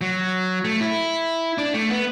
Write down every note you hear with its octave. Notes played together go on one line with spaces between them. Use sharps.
F#3
A3
E4
D4
A3
B3